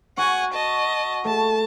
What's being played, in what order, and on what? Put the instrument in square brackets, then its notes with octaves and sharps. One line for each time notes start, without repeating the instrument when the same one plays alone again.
[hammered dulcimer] F#4 [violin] F#5 G#5
[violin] D#5 A5
[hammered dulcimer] A3 [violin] A5